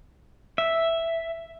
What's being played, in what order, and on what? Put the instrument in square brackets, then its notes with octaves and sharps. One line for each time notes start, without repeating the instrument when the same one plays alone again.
[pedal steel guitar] E5